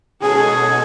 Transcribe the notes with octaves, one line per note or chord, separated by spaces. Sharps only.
B2 G#3 C#4 F#4 G#4 A4